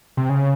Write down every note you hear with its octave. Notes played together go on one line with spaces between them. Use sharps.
C3
C#3